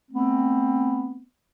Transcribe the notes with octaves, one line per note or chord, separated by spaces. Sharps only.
A3 B3 C4